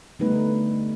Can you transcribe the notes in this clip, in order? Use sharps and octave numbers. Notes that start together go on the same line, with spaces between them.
D3 G3 A3 B3 D#4 B4